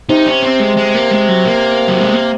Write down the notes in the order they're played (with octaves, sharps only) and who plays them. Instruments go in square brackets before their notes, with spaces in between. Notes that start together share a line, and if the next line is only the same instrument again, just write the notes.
[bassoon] C3 [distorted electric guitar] D#4
[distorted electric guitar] C#4
C4
G#3
G#3
A#3
G#3
F#3
A#3
F#3
G#3
A#3